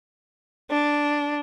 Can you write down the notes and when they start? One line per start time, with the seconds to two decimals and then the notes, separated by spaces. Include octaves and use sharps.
0.71 D4